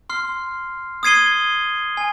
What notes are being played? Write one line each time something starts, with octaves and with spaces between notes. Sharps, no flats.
C6 F6 C7
D#6 G#6 C7 D#7 G7
G#5